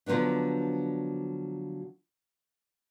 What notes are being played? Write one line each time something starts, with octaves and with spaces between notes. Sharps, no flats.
D3 F3 F#3 B3 D4